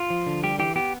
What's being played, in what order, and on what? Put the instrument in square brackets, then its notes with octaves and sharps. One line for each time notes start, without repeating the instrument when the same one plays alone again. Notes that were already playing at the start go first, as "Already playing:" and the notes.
Already playing: [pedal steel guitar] F4
F3
D3
G3 G4
E3 G4
B3 G4